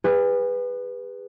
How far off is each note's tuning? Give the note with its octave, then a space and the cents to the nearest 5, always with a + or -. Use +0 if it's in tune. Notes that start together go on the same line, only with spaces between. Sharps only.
G#4 -45 B4 +0